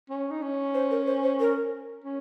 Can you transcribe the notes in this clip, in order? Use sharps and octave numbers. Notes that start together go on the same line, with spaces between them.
C#4
D#4
C#4
C5
A#4
C5
C5
A#4
C#4